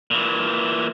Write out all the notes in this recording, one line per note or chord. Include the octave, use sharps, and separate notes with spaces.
A#2 E3